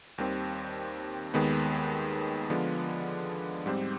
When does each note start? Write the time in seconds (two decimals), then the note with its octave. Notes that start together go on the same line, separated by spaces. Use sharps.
0.18 D#2 D#3 G3 C4
1.34 D#2 D#3 G#3 B3
2.50 D3 F3 G#3 B3
3.66 G#2 G3 C4